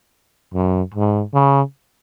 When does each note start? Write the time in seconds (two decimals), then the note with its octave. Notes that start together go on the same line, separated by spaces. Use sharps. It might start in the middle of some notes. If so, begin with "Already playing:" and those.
0.54 F#2
0.95 G#2
1.34 C#3